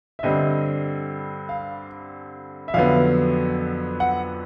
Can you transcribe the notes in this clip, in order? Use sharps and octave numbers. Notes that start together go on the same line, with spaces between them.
E5
G2 D3 G3 C4 D#5
F5
E5
F2 D3 F#3 B3 F5
F#5